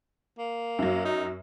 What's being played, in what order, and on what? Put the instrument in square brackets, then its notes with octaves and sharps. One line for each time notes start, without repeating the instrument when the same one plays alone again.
[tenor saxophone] A#3
[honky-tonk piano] F#2 F#3
[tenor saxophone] D#4